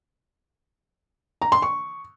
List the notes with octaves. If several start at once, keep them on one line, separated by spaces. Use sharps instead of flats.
A#5
C6
C#6